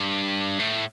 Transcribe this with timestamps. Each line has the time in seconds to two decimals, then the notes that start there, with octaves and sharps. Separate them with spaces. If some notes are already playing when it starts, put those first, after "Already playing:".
Already playing: G2
0.59 A2